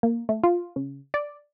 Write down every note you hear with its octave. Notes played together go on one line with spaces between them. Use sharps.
A#3
A3
F4
C#3
D5